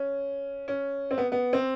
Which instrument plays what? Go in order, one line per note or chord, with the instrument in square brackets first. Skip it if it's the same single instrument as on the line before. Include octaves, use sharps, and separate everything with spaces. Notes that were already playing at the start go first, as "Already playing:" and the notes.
Already playing: [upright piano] C#4
C#4
C4
B3
B3
C4